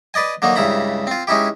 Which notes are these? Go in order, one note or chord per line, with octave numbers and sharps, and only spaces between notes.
B4 D5 D#5 G#5
D3 F#3 A#3 D#4
C#2 G2 C#3 E4 A#5 B5
C4 F4
G#3 C#4 D#4 E4 G4